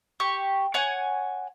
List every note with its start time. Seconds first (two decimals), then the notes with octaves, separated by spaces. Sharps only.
0.20 G4 C#6
0.74 C#5 F#5 G#5